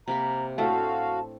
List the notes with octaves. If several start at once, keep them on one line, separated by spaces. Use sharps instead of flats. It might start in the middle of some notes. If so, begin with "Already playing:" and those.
C3 A#3 A#5 B5
A2 A3 C4 D4 F#4 A4 F5 A5